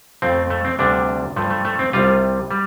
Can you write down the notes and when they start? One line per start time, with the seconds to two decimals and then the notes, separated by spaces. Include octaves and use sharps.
0.22 F2 F3 A3 C4
0.50 A3
0.65 C4
0.79 D2 C3 G3 D4
1.36 G2 F3 A3
1.50 A3
1.65 A3
1.79 C4
1.93 C2 C3 G3 F4
2.51 G3